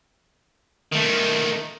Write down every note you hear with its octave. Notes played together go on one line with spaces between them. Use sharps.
D#3 A3